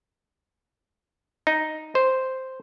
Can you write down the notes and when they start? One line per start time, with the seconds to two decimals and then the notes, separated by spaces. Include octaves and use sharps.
1.47 D#4
1.95 C5